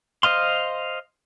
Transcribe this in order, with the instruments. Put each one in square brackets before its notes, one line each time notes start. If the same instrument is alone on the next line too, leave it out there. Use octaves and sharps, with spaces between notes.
[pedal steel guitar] C5 D#5 F5 C6